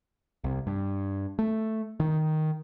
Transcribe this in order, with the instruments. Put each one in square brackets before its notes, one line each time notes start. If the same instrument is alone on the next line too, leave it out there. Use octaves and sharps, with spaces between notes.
[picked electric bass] C2
G2
A3
D#3